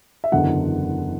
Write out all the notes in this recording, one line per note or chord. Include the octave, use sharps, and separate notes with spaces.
E5
F#1 E2 D3 F#3 F#5